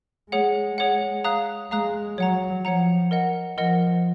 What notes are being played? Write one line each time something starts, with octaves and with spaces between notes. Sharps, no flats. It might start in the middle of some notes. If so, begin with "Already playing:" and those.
G#3 G#4 C#5 F#5
G#4 C#5 F#5
F5 A#5 D#6 F#6
G#3 F5 A#5 D#6 F#6
F#3 C#5 F#5 A#5
F3 C#5 F#5 A#5
A#4 D#5 F#5
F3 A#4 D#5 F#5